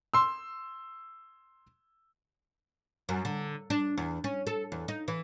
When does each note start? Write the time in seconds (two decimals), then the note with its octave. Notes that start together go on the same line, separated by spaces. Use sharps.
0.14 C6 E6
3.09 F#2
3.25 D3
3.70 D4
3.98 E2
4.24 C#4
4.47 A4
4.72 E2
4.88 D#4
5.08 E3